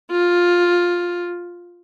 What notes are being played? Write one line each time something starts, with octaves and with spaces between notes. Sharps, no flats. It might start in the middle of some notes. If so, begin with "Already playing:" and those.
F4